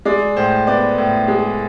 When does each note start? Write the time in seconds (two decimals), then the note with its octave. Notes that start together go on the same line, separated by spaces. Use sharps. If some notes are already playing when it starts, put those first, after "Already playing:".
0.05 G#3 D5
0.36 A2 C5
0.67 B3 D5
0.98 A2
1.28 G#3